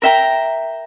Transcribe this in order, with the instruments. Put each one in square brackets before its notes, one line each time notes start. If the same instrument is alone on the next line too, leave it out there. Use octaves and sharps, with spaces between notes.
[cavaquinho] A#4 E5 G5 A#5